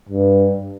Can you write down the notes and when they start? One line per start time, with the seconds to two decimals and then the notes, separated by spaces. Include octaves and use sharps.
0.09 G2